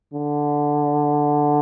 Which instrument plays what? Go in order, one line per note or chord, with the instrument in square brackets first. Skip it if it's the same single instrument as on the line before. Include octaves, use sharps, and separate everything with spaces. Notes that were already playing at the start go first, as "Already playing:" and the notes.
[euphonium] D3